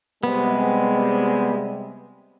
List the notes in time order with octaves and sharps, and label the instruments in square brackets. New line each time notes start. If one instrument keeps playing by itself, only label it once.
[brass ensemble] C3 G3 G#3 [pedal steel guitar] B3